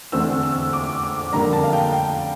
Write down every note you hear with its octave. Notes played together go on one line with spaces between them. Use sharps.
E2 D3 A3 C4 E6
E6
D6
D6
F2 D3 G3 A#3 A#5
A5
F5
G5
G5